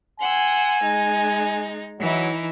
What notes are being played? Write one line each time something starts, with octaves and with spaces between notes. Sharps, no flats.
F#5 G#5 C6 E6
G#3 D#4
E3 F#3 D#4 E4